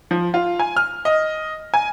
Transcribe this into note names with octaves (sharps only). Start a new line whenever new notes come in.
F3
F4
G#5
F6
D#5
G#5